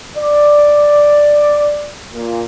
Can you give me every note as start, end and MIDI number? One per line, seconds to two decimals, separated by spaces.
0.17 1.90 74
2.14 2.44 46